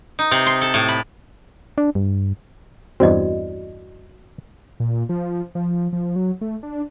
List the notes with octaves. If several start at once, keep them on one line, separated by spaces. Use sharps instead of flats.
D#4
C3
C6
A4
A2
B5
D4
G2
E2 G2 C4 F#4 D5 D#5
A#2
F3
F3
F3
F#3
A3
D4